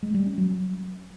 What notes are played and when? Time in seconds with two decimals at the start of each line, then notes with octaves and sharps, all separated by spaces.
0.03 G#3
0.14 G3
0.26 C#4
0.38 F#3